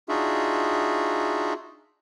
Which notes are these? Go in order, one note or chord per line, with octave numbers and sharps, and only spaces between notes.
D4 D#4 F4 F#4 G#4 E5